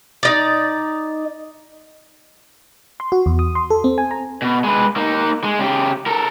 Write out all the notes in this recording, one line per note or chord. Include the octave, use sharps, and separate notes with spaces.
D#4 D5
C6
F#4
E2
D#6
C6
A4
C4
G#5
A#5
B2
G#3 B4
A#3 D#4
G#3
C#3 G4
A4 A#4